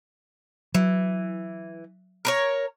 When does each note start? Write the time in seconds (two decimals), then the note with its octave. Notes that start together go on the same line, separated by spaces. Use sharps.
0.75 E3 F#3
2.25 A#4 B4 C#5